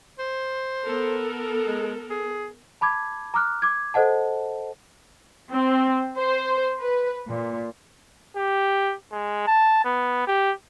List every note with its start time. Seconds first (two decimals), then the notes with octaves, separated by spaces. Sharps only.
0.19 C5
0.84 B3 A4 A#4
1.66 G#3
2.10 G#4
2.81 A5 B5 D6 G#6
3.34 A#5 D6 F6 F#6
3.62 D6 G#6
3.94 A4 C5 D#5 F#5 A5
5.51 C4
6.18 C5
6.80 B4
7.28 A#2
8.36 G4
9.12 G#3
9.47 A5
9.84 B3
10.27 G4